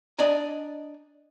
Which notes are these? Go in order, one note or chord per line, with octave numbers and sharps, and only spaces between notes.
D4 D5 D#5 G#5 A#5